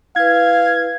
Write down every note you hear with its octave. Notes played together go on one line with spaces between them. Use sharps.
E4 B4 F5 G#6